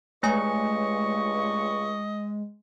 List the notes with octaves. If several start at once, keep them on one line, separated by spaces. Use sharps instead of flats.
C#2 G2 G#3 A3 C#5 D#5 G#5 C#6